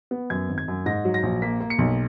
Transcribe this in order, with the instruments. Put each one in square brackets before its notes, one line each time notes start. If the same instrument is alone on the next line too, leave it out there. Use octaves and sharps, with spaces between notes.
[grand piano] B3
F#2 G#6
G#1
G#6
F#2
G#2 A#6
F#3
A#6
A#1
A#3 B6
A#3
C#7
B1